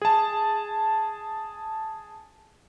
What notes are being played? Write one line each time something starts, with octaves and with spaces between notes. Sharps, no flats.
G#4 A5